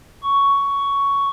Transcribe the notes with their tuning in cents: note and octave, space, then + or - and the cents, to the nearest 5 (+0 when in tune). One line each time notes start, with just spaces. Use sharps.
C#6 +10